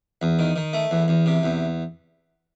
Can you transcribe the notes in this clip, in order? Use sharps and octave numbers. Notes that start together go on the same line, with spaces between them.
E2
D#3
D#3
A3
E2
E2
C3
E2